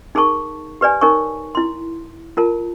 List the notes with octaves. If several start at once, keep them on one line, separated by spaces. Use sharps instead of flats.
D#4 G#4 A#4 A5 C#6
G4 B4 D5 G#5
D#4 A#4 C#5 G#5 C#6
E4 C6
F4 A#4 A5